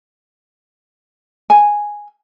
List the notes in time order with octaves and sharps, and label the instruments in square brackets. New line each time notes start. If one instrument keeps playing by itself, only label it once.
[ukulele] G#5